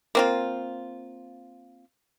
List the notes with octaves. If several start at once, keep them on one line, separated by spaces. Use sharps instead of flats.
A#3 C4 F4